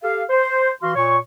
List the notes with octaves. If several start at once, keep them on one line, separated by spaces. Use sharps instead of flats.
G4 A4 F5
C5
E3 F#4 F5 C6
A#2 C#5 C#6